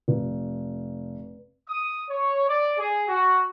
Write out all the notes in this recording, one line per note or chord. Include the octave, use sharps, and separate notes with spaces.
F1
D#6
C#5
D5
G#4
F#4